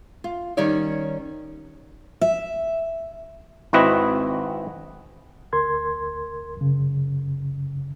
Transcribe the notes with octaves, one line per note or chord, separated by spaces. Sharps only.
F4
D#3 G3 C#4 C#5 D5
E5
G#1 C4 E4 F#4 B4 D#5
D2 A#4 C6 G#6
F#2 C#3